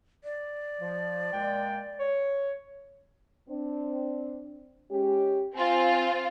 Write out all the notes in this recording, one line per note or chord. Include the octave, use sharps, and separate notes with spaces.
D5
F3
A#2 G#3 G5
C#5
C4 D4
G#3 C#4 G4
C4 F4 G#5